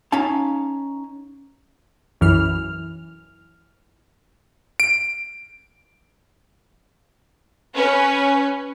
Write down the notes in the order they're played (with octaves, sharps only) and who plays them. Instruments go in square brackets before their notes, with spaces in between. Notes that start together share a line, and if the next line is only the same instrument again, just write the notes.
[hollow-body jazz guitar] C#4 D#4 F5 A5
[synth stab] B1 F#2 E3 F6
[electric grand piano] D7
[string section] C#4 B4